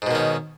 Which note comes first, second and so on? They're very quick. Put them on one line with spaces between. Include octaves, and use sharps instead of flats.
G#2 B2 D#3 C#4